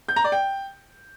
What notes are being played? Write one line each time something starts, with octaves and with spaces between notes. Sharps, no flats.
G6
A#5
D5
G5